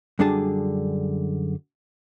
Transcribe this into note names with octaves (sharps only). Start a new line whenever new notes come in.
F#2 D3 G3 D4 G#4 A5